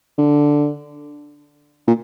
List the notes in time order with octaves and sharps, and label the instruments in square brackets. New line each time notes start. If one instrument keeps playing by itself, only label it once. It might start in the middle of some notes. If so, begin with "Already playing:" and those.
[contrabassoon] D3
A#2